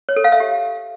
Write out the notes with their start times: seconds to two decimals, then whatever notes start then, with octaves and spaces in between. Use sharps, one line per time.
0.09 C#5
0.16 A4
0.24 F5
0.32 E5
0.40 G4